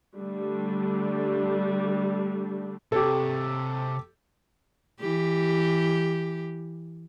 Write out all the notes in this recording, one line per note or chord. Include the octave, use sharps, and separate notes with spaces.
D3 G3 A3 D4
C3 G4 A4 C#5
E3 G4